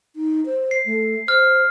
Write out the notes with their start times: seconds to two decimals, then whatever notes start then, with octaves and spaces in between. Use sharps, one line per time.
0.16 D#4
0.46 C5
0.71 C7
0.86 A3
1.28 C5 F6